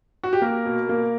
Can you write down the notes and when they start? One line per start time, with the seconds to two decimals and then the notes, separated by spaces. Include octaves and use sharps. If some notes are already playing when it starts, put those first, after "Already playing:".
0.23 F#4
0.33 G4
0.42 A#3 A#4
0.65 B2
0.89 A#3